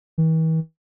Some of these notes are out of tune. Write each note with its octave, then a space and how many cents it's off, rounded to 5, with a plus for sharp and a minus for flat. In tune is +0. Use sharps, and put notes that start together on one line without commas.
E3 -45